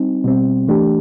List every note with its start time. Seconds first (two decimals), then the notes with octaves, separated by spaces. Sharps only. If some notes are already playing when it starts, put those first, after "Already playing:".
Already playing: G3 C4 D#4
0.24 B2 G3 C4
0.67 E3 A3 D4 G4